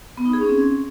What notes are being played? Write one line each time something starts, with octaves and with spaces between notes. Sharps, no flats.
B3
D#4
G#4
C#4
C4